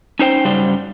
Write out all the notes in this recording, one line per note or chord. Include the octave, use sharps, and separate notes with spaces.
C#4 D#4 C5 G5
G2 C#3 F#3 G3 C5